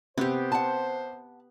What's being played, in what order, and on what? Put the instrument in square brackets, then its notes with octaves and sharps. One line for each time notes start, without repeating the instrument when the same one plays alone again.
[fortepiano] C3 [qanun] B3 G4 [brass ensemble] C5
[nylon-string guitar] F#5 A5